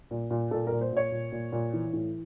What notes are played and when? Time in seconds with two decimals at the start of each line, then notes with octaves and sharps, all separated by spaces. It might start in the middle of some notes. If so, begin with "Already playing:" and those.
0.11 A#2
0.31 A#2
0.51 A#2 A4
0.67 A#4
0.72 A#2
0.81 C5
0.92 A#2 C#5
1.12 A#2
1.32 A#2
1.52 A#2
1.73 E3
1.93 A2